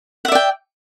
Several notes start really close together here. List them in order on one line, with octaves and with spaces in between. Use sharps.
F#5 E5 D5 G5